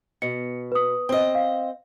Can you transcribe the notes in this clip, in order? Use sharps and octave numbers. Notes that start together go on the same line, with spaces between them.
B2 C#7
B4 D#6
C4 D#5
F5